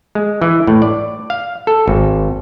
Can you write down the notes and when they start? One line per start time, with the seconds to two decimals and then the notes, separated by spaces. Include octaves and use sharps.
0.15 G#3
0.42 E3
0.67 A2
0.82 D5
1.30 F5
1.67 A4
1.88 G#1